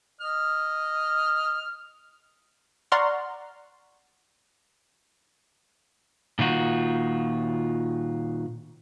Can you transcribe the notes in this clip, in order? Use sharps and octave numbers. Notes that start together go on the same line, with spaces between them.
D#5 F6
D5 F#5 A#5 C6 C#6 F6
A#2 D#3 F4 F#4